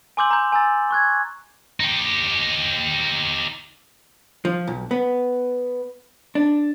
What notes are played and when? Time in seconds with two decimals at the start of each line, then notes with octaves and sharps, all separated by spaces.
0.17 G#5 C6 D6 E6 G6 F#7
0.31 A#5 G6
0.52 G#5 A#5 E6 A6
0.91 C#6 F#6 G#6
1.80 D#4 G4
4.45 F3
4.67 B1
4.91 B3
6.35 D4